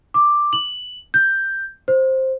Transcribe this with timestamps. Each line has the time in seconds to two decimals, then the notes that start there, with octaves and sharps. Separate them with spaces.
0.14 D6
0.53 F#7
1.14 G6
1.88 C5